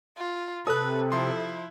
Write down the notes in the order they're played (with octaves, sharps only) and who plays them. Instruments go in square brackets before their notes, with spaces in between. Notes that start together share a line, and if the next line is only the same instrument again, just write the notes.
[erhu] F4
[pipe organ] C3 [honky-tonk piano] A4 [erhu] B4 [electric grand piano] D#6 F#6
[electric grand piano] F3 C6 [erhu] E4